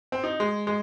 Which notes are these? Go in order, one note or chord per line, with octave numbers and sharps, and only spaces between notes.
C4
D#4
G#3
G#3